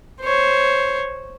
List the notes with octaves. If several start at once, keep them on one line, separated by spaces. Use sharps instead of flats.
C5 C#5